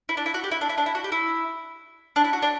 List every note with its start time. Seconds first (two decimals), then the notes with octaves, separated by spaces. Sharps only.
0.09 E4
0.17 D4
0.26 E4
0.34 F#4
0.44 G4
0.51 E4
0.61 D4
0.69 E4
0.78 D4
0.86 E4
0.95 F#4
1.04 G4
1.12 E4
2.16 D4
2.24 E4
2.33 F#4
2.42 D4